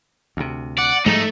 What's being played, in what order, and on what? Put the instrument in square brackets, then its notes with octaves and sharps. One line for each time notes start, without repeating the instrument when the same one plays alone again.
[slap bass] D2 C3
[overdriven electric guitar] D5 [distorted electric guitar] F#5
[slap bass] G#2 F3 G3 [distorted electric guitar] A3 [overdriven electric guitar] D#4